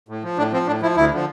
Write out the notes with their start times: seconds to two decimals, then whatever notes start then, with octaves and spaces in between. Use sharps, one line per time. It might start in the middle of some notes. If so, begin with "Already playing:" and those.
0.09 A2
0.23 F3
0.38 A2 D4
0.53 F3 C4
0.67 A2 D4
0.81 F3 E4
0.96 D2 E4
1.11 D3 F3